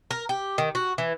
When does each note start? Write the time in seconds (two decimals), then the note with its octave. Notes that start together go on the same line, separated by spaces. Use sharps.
0.11 A#4
0.29 G4
0.58 D#3
0.75 F#4
0.98 E3